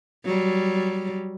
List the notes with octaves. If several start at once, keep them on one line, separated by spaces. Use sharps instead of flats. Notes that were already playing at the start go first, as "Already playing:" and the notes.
F#3 G3